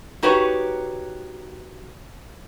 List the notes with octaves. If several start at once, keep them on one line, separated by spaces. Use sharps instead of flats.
D#4 F#4 G4 B4 C#5